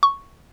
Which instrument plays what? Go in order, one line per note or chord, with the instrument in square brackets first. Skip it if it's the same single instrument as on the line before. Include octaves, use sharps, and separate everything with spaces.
[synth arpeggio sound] C#6